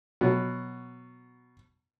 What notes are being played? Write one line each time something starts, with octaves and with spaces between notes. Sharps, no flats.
B2 F#3